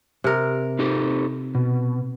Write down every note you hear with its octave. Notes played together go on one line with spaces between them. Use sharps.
C3 A#4
D#4 G4 A4
B2